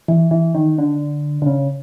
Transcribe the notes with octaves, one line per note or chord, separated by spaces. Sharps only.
E3
E3
D#3
D3
D3
C#3